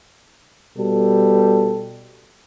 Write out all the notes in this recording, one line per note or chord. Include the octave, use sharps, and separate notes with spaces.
B2 G3 A4